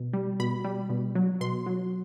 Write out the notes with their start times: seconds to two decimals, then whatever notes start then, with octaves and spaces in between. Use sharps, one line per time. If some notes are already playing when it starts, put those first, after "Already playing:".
Already playing: B2
0.13 G3
0.40 B2 B5
0.64 G3
0.90 B2
1.15 F#3
1.41 B2 C6
1.66 F#3